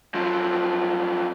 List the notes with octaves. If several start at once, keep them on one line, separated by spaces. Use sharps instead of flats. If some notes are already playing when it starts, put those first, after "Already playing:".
F#2 F3